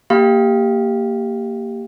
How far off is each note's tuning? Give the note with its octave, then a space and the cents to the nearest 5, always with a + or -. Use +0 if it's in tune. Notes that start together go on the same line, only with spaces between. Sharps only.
A#3 -15 G4 +5 F5 +0